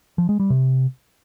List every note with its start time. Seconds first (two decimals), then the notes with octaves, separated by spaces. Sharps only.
0.18 F3
0.29 G#3
0.40 G3
0.50 C3